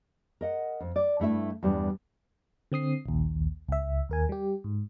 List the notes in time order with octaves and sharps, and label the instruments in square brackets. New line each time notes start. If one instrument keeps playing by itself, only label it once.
[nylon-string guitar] A#4 D#5 F#5
F2
D5
G2 A3 E4 E5
E2 G2 G3 D4
[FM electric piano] D3 C4 D#6 C7
A#1 D#2
C#2 E5
D#2 A#4 G#5
G3 G4
G#2